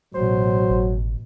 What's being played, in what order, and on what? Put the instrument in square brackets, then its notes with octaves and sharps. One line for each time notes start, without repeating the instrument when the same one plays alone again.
[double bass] A1 B2 [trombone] F#3 [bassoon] C5
[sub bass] G#1